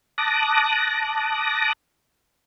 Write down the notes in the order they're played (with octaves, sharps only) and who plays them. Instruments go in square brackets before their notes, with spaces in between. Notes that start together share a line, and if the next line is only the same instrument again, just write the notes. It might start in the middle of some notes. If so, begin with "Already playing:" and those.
[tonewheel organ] A5 D6 D#6 F#6 A#6